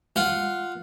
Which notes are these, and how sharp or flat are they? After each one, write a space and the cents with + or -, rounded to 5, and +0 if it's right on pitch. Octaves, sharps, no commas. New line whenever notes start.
F4 +0 F#5 +0